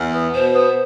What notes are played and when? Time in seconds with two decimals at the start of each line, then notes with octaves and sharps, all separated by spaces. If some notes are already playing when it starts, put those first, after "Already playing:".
Already playing: E2
0.14 B3
0.34 B2 C5
0.54 B3